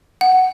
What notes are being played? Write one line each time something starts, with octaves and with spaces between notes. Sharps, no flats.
F#5